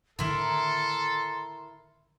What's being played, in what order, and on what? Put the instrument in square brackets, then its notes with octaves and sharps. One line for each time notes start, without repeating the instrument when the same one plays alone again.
[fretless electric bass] A2 D3 D#3 [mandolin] E4 A#4 [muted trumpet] A4 [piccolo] C6